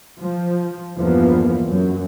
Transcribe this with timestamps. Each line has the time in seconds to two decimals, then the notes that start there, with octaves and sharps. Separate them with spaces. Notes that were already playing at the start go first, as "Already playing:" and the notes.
0.20 F3
0.95 E2 G2 E3 F3 A#3 B3
1.65 F#2